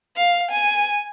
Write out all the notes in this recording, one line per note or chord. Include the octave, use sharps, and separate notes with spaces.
F5
G#5